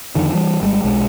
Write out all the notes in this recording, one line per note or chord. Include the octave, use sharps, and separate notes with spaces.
F2 D3 D#3
E3 G3
G#1 G3 G#3
D#1 B1 G#3